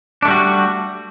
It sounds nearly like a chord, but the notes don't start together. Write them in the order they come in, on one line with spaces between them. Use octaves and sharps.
D4 A3 G3 F#4